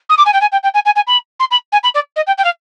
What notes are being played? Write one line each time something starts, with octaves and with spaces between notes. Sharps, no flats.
D#6
D6
G#5
G5
G#5
G5
G5
G#5
G#5
G#5
B5
C6
B5
G#5
B5
D5
D#5
G5
G5
F5